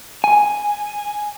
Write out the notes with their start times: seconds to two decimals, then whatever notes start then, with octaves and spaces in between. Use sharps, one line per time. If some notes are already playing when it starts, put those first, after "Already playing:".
0.24 G#5